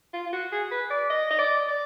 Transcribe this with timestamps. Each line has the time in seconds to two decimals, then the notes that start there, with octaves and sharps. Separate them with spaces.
0.13 F4
0.27 F4
0.33 F#4
0.52 G#4
0.71 B4
0.91 D5
1.10 D#5
1.30 D#5
1.39 D5
1.68 D5